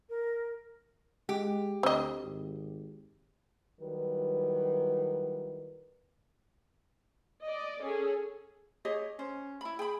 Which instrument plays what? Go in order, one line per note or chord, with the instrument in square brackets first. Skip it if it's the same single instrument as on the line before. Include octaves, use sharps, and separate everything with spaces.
[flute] A#4
[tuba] G#3 [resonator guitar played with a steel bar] G4
[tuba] D2 [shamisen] C4 D#5
[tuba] G#1
[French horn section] D#3 F#3 G3 E4 B4
[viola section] D5 D#5
C#4 G#4 A4
[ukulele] G4 G#4 D#5 [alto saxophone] C#5
[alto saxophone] C#4 [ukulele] C5
[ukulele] E4 B5
[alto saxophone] G#4 [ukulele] G5 B5